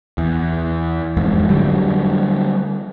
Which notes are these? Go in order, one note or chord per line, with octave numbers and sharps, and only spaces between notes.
E2
E1 F2 G#2
D3 F#3 G3